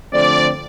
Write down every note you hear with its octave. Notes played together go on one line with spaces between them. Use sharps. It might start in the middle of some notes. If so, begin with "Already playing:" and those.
D3 F3 A3 C4 D5